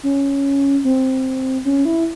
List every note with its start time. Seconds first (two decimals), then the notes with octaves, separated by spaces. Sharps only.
0.03 C#4
0.84 C4
1.65 C#4
1.85 E4